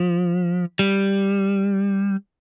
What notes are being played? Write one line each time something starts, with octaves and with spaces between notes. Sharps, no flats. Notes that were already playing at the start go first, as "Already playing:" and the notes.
Already playing: F3
G3